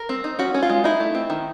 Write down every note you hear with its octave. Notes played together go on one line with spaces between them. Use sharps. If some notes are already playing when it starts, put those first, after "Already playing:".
Already playing: A#4
C4
D#4
C#4 F#4
C#4
F4
G#3
D#4 E4
A3
C4
D#3